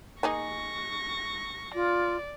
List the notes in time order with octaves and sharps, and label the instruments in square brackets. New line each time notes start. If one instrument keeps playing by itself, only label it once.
[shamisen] A#3 D#4 G#4 [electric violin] C#6 A#6
[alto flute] F4 [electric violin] D5